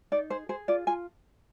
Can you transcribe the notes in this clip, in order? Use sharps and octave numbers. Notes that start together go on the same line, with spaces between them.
D#4 D5
G#4 C5
G#4 C5
F4 D5
F4 G#5